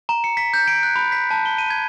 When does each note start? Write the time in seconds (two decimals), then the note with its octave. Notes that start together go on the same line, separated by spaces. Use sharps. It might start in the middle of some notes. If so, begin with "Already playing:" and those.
0.09 A#5
0.24 C#7
0.37 B6
0.54 G6
0.67 D7
0.83 F#6
0.96 B5
1.12 B6
1.31 A5
1.46 G7
1.58 D#7
1.70 G#6